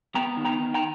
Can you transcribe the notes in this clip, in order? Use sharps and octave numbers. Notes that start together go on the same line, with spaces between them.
B3 G5 A#5
D#3
G5 A#5
D#3
G5 A#5